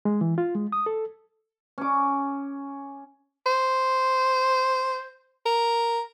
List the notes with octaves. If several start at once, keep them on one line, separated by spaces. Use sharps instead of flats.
G#3
E3
F4
G#3
D#6
A4
C#4 D6
C5
A#4